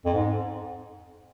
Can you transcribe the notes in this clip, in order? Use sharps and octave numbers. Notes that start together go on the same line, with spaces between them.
F2
G#2